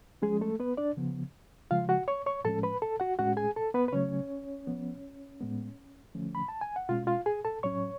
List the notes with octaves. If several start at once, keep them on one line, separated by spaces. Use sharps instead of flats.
F3 G#3 C#4 G#4
A3 A4
B3 B4
D4 D5
C#3 F3 B3
C#3 F3 G#3 F4 F5
F#4 F#5
C#5 C#6
C#5 C#6
A2 F3 G#3 C#4 A4 A5
B4 B5
A4 A5
F#4 F#5
A2 G#3 C#4 F#4 F#5
G#4 G#5
A4 A5
B3 B4
B4
C#3 F#3 A3 C#4 C#5
F3 B3
A2 G#3 B3
D3 F3 A3 C#4
B5
A5
G#5
F#5
B2 G#3 C#4 F4 F5
F4 F5
G#4 G#5
A4 A5
A2 F#3 C#4 C#5 C#6